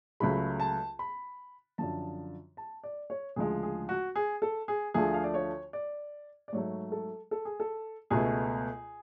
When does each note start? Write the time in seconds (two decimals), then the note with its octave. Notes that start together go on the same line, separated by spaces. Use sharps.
0.20 C#2 C#3 F#3 A3 B5
0.60 A5
0.99 B5
1.78 F#2 D3 F3 A5
2.57 A5
2.84 D5
3.10 C#5
3.36 D2 C#3 F3 G#3 G#4
3.63 G#4
3.89 F#4
4.16 G#4
4.42 A4
4.68 G#4
4.94 D2 D3 F3 A3 G#4
5.14 F5
5.24 D5
5.34 C#5
5.73 D5
6.48 D5
6.53 G#2 F#3 A3 C#5
6.92 A4
7.31 A4
7.45 G#4
7.60 A4
8.10 C#2 B2 A3 G#4